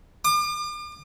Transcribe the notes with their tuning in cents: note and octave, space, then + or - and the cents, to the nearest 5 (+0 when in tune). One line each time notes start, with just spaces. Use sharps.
D6 +40